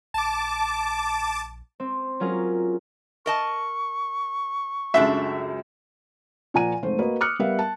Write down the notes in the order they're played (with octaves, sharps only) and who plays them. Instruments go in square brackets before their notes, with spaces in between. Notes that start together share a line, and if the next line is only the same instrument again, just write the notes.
[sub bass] A#1 [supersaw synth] A5 D6
[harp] C4
F#3 C#4 F4 G#4 A#4
[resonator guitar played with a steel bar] A#4 D#5 A5 [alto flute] C#6
[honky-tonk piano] C#2 F#2 [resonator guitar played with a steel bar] G#3 A3 D4 [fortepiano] E5
[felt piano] A#2 F3 F#5 G#5 A#5 D#7
F1 G#2 A3 C5
A#3 F#4 B4 D#5
D6 D#6 F6 F#6 C#7
G3 B3 A#4 E5 F5
A5